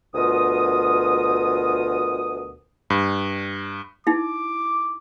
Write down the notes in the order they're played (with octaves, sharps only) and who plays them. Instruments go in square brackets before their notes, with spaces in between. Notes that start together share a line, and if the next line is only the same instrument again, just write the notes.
[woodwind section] D2 B2 F4 A#4 D#6
[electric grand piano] G2
[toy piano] D#4 E4 [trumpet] D6